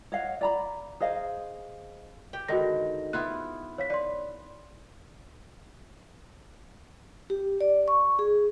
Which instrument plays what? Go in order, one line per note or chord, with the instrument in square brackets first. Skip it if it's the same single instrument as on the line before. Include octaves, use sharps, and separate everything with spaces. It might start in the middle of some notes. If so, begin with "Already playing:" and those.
[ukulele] C#5 D#5 F5 F#5
D5 A#5 B5
G#4 C5 D#5 F5
[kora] G4 G5
[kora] G#2 D3 D#3 [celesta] F#4 A#6
[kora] B3 E4 F4 [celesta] F#6
[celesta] C#5 F5 B6
[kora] B4 [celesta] D5 C6
[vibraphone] G4
D5
C#6
G#4